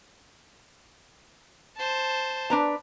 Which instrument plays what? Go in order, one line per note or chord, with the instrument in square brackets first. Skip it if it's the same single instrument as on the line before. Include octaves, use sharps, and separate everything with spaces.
[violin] C5 A5
[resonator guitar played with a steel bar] D4 B4 A#5